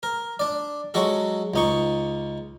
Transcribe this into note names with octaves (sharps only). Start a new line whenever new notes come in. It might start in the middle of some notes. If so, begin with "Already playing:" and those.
A#4
D4 D5
F#3 G#3 F#4 A4
C#2 D#4 C#6